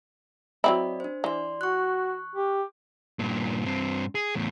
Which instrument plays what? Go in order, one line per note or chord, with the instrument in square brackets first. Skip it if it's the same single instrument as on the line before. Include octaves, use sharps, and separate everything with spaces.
[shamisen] F#3 C4 E4 [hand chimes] D5 D#5 B5
[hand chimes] D4 C5
[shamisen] E3 [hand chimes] D5 C6
[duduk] F#4 [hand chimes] C#6 F#6
[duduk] G4
[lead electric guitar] G2 A#2
G2 C4
G#4
E2 A2